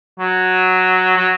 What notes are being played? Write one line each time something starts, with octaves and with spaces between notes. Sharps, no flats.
F#3
F#3